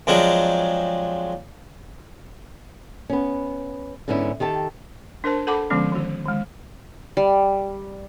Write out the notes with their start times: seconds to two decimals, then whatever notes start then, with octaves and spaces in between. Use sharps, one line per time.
0.07 F2 F3 F#3 G#3 D4
3.10 B3 C#4
4.08 G#2 D3 B3 C#4 E4
4.40 D#3 G4 A4 A5
5.24 D4 A#4 C5 A5
5.47 A4 F#5 A5 B5 D6
5.70 D3 F3 G#3 B3 C#4
5.92 D#3 F#4
6.26 D#3 G#3
7.17 G3